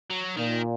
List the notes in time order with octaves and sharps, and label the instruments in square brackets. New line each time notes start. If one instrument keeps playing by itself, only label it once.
[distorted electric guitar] F#3
[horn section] A#2 [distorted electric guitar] D#3